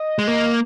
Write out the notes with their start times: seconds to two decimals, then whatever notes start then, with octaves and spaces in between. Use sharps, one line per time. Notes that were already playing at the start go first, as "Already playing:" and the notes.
Already playing: D#5
0.19 G#3
0.27 A#3